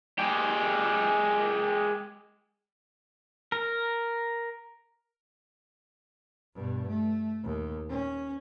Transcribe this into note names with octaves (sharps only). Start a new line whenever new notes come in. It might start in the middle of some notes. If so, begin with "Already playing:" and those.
G#3 G4
A#4
G2 B2
A3
D#2
C#4